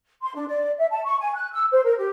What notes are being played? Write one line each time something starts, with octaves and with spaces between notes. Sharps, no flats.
C6
D4
D5
E5
A5
C#6
G#5
F#6
E6
C5
A#4
G4